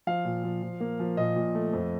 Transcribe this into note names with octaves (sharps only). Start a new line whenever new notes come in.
F3 F5
A#2
F3
F3
A#3
F3
A#2 D#5
A#2
A3
F2